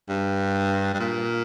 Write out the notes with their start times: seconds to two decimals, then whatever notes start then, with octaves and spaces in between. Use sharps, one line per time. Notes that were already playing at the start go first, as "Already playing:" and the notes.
0.09 G2
0.94 G2
1.00 A#2